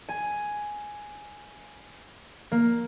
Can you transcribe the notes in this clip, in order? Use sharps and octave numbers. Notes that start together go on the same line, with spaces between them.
G#5
A#3